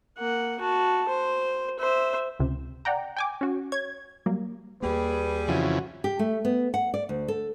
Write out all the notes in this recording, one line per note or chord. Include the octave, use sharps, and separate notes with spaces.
A#3 F#5
F#4 A5
C5
C5 E5
C#2 C3
D5 F#5 G5 A#5
G5 G#5 D6
C#4 F#4
C#5 G#6
F#3 G3 A#3
D#2 G3 A#3 G#4 B4
F2 C#3 E3 F#4
G4
A3
B3
F#5
D5
D2
A4